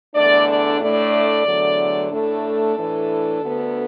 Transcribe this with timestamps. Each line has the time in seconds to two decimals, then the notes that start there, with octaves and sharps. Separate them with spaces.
0.15 E2 D3 A3 D4 D5
0.48 D5
0.80 A2 A3 D4 D5
1.45 E2 D3 F#3 A3
2.10 A2 A3 D4 A4
2.75 A2 E3 D4
3.41 D2 D3 B3